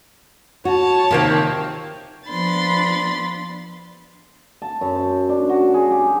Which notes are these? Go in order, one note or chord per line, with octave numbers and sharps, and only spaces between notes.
F#4 C#5 A5
C3 D#3 F3 A#3 C4
F3 B3 D4 B5 C6 A6
A5
F#2
C5
D4
F#4
G#4
G4